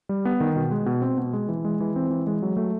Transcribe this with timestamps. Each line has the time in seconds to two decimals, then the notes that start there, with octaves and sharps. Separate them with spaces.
0.09 G3
0.25 B3
0.40 D#3
0.56 B2
0.71 G#3
0.86 B2
1.02 C4
1.18 B2
1.33 G#3
1.48 E3
1.65 G#3
1.80 E3
1.96 C4
2.10 E3
2.27 G#3
2.42 F#3
2.57 A3